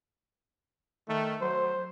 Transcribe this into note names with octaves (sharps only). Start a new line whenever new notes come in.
D#3 A3
F#3 C5